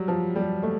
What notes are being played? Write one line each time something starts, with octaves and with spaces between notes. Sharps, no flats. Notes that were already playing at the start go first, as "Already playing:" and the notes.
Already playing: F#3 G3
F3
G3
A3